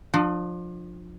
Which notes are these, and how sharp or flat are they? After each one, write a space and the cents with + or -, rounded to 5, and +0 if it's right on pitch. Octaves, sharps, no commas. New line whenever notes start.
F3 +20 D4 +40